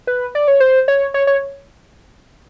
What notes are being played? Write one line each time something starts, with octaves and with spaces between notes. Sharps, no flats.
B4
D5
C#5
C5
C#5
C#5
C#5